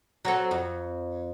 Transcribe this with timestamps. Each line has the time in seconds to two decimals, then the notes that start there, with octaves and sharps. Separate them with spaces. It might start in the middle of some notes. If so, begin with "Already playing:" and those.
0.25 F#3 C4 A4
0.51 F2